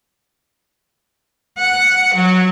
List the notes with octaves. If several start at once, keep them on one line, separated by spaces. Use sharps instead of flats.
F#5
F#3